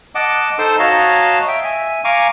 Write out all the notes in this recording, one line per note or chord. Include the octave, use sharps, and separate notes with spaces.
D#5 F#5 A5 D6
D#4 A4 C5 C6 E6
F#4 C#5 D#5 F5 A5 A#5
E5 G5
E5 G#5
F5 G#5 A#5 C#6 D6